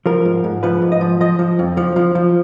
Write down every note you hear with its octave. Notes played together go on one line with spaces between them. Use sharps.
F3 A#4
G#2
G#2
F3 B4
G#2
D#5
F3
F3 D#5
F3
F2
F3
F3
F3